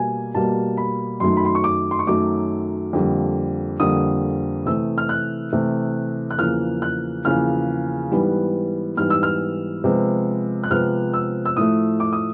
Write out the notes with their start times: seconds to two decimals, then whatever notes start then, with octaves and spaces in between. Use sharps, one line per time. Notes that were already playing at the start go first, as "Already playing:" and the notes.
Already playing: B2 G3 A#3 G#5
0.35 B2 G3 A#3 A5
0.77 B5
1.20 F#2 D#3 F#3 A3 C6
1.37 B5
1.45 C6
1.55 C#6
1.64 D6
1.91 C6
1.99 C#6
2.07 F#2 D#3 F#3 A3 D6
2.93 F2 D3 G3 A#3
3.80 F2 D3 G3 A#3 D#6
4.66 C3 E3 A3 E6
4.98 F6
5.09 F#6
5.52 C3 E3 A3
6.31 F#6
6.38 E2 C#3 F3 A#3 F6
6.82 F#6
7.25 E2 C#3 F3 A#3 F6
8.11 G#2 E3 G3 B3
8.97 G#2 E3 G3 B3 F6
9.10 E6
9.23 F6
9.84 C3 F3 G#3 B3
10.64 F#6
10.70 C3 F3 G#3 B3 F6
11.13 E6
11.45 E6
11.56 A2 F3 A3 D#6
12.00 D6
12.13 D#6